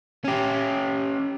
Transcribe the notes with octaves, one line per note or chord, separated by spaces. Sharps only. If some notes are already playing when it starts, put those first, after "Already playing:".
C#4 G4